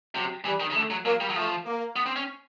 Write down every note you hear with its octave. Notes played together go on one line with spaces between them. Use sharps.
C3 F#3
E3 G3
D#3
C#3
D3 A3
F#3
F#3 A#3
G3
F#3
F3 A3
A#3
B3
C4
C#4